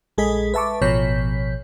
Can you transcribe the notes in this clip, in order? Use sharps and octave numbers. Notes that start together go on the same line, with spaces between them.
A#1 G#3 G#4 A4 D#5 B6
B4 E5 A5 C#6 D6
A1 B2 F3 C#5 G6 B6